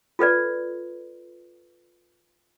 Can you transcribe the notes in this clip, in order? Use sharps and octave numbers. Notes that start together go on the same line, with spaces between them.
F4 A4 B4 D5